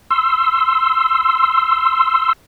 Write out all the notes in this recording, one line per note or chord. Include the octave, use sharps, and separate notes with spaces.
C6 E6